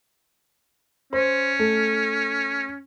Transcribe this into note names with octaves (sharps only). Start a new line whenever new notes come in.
C#4 C5
A3